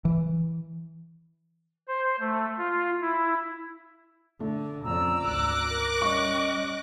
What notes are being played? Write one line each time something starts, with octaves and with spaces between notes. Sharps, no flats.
E3
C5
A3
F4
E4
D3 A3
F2 C#3 D5 A#5 E6
G#1 D2 D6 F#6 A#6
A#4
G3 C#4 D#5 C#6